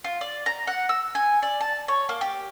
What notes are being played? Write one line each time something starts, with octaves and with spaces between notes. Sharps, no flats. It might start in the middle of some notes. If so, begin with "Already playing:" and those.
F4
D5
A#5
F#5
E6
G#5
D5
A5
C#5
A#3
G4